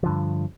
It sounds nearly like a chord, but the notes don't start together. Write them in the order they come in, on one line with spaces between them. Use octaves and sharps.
F3 D3 G2